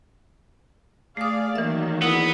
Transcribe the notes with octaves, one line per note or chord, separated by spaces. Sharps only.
A3 G#4 D5 F5 D#6
D#3 E3 F#3 A#3 E5
E2 B3 E4 D#6